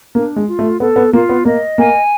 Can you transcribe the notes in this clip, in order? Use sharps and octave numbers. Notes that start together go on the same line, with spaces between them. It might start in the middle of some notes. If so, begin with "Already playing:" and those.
A#3 D4
G#3
F4
A3
B3 A4
B3
A#3 F4
B3
A#3 D#5
A#3 G#5